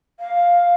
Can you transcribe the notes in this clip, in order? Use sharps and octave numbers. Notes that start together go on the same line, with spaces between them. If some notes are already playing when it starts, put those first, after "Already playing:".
F5